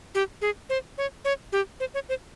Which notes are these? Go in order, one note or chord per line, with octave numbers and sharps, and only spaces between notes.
G4
G#4
C5
C#5
C#5
G4
C5
C#5
C5